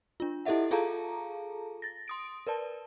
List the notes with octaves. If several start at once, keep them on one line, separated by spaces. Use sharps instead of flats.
D4 F4
E4 G4 A4 D#5 E5 F#5
F4 G#4 A4 F5 A5 A#5
A6 A#6
C6 D#6 D7
A#4 B4 D5 A5